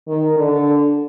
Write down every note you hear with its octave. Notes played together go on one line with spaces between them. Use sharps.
D#3
D3